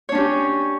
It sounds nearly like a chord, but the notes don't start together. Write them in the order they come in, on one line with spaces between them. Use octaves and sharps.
C#5 D4 C#4 G4